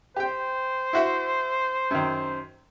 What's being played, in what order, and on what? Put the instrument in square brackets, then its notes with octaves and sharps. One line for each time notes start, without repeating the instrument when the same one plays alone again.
[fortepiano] G4 G5 [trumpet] C5
[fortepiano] E4 F#4 E5
F#2 D#3